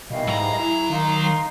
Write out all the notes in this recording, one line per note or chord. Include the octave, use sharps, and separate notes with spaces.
B2 D#3 E3 G3 D#5 F5
G#2 F#3 A#5
E4 G#4
D#3 D#4 F5 C6